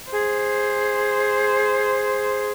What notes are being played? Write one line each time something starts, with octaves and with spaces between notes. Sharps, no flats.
G#4 C5